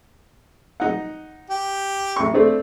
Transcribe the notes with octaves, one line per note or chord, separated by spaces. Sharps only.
D#4 F#5
G4
A1 C#6
A3 C4 D4